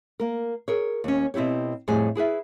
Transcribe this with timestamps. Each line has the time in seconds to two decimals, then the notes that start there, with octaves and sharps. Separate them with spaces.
0.20 A#3 A#4
0.68 G#4 A#4 C#5
1.04 D#2 C#4
1.34 B2 C4 E4 G4 C#5
1.88 F2 A2 G3 G#4 G#5
2.15 E4 G#4 B4 E5